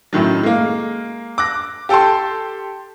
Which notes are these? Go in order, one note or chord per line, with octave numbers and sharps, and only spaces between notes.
F#2 A2 D#3 F#3
G#3 A#3
D6 F#6 A#6
G4 A4 G5 A5 C6